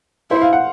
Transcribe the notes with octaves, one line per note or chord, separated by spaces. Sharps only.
E4 C5
F5
F#5